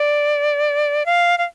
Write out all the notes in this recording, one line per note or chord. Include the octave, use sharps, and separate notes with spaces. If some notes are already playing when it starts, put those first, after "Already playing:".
Already playing: D5
F5
F5